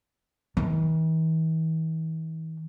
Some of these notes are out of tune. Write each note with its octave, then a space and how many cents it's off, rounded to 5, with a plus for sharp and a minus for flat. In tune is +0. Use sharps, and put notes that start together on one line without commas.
E3 -45